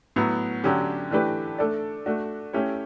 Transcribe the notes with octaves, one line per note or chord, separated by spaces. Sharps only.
A2 F#3 B3
D3 F#3 C#4 G4
E3 A3 D4 G4 B4
A3 D4 A4 D5
A3 D4 F#4
A3 C#4 E4 G4 C#5